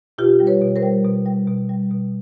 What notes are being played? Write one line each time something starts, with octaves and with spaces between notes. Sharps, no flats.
B2 F4 G4
G3
B4 C#5
B2
A#4 C5
G3
B2
G3
B2
G3
B2